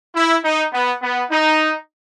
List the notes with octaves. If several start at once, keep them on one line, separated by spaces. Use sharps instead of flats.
E4
D#4
B3
B3
D#4